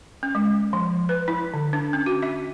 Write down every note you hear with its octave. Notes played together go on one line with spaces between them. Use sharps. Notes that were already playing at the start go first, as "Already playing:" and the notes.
C#4
G#3
F3
B4
E4
D3
D4
C#4
F#4
E5